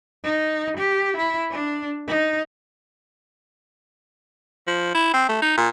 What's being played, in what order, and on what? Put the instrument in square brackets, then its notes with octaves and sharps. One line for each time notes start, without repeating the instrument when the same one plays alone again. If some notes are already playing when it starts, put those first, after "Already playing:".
[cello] D#4
G4
E4
D4
D#4
[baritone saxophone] F3
E4
C4
A3
D#4
A#2